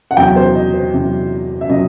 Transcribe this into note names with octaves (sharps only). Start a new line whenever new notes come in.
F#5
E2 C3 F#3 G5
C5
D#5
C5
E2 C3 F#3
E5
C3 F#3 D#5